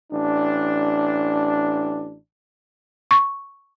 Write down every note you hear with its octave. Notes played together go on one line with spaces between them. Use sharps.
A1 D4
C#6